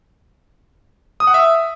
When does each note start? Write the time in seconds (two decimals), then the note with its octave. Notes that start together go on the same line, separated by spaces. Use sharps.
1.20 D#6
1.27 F#5
1.34 E5